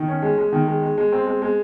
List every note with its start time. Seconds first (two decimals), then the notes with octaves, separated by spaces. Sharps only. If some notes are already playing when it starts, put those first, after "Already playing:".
Already playing: D#3
0.08 C#4
0.22 G#3
0.38 G#3
0.53 D#3
0.68 G#3
0.82 G#3
0.98 G#3
1.12 C4
1.26 G#3
1.42 G#3